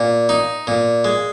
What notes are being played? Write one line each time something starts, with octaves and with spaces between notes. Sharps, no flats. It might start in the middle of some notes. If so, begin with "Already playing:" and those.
Already playing: A#2
D#4
A#2
G#3